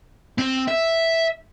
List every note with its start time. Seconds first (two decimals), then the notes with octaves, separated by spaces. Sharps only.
0.39 C4
0.68 E5